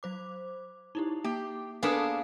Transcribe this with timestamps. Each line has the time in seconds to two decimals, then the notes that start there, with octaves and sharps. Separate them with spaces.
0.03 F#3 C5 D6
0.95 D#4 E4 G4
1.24 A#3 G4
1.83 A#3 B3 D4 G#4 A4 B4 B5